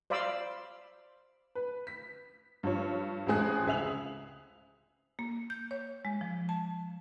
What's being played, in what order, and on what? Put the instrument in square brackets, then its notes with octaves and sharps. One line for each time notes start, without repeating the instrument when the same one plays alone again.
[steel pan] C5 D5 F5 B5 D6 E6
[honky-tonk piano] B4
B6
G2 F3 C#5
A1 F2 G#3 G#4 F#6
C#2 G#4 E5 F7 F#7
[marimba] A#3
G6
C#5
G#3
F3
A5